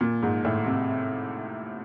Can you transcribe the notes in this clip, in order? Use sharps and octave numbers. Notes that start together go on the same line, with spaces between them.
A#2
G#2
A2
C3